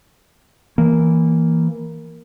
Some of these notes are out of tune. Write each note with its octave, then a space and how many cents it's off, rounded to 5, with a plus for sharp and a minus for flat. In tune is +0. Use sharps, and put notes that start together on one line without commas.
E3 +0 A#3 +0